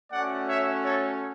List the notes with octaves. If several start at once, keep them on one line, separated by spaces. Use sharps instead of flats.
A3 C#4 F#4 D5 F#5
C#5 E5
A4 C#5